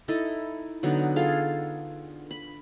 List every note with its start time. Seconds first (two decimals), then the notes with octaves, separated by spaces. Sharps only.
0.08 D#4 E4 A4 D#5
0.83 D3 F#3 B3 D#4
1.16 F4 G#4 A4 F5
2.31 B5